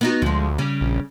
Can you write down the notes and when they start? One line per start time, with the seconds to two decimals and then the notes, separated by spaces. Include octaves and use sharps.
0.01 B3 D#4 F#4
0.22 D2 F3 G#3
0.58 C#3 G3 C#4
0.81 A#1